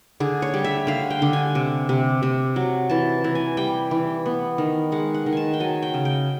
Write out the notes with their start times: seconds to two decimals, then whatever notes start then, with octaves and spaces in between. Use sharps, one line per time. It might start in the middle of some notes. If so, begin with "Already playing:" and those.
0.20 D3 G#4
0.42 C#5
0.54 G3
0.64 E5
0.87 D3 F5
1.10 G5
1.22 D3
1.33 G#5
1.55 C3
1.89 C3
2.23 C3
2.56 F#3
2.90 E3 A5
3.24 E3
3.35 G#5
3.57 G3 G5
3.91 E3
4.26 B3
4.58 D#3
4.92 G#3 F#5
5.14 F#5
5.26 D#3
5.32 G#5 A5
5.53 G5
5.60 F#3 G#5
5.83 G5
5.94 C#3
6.05 G5